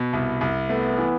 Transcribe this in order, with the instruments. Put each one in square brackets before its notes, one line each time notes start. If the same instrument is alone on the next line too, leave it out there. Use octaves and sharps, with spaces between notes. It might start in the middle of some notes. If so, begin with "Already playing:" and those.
Already playing: [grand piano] B2
C2
C2
[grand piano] A3 [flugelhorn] B3
[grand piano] E3